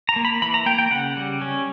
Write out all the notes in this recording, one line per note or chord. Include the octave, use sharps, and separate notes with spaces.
A#5
A#3
B5
E3 B5
A#5
A#3 G5
G5
C#3 F#5
G3
C#4